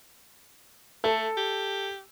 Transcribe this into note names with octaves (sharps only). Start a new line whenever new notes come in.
A3 A4
G4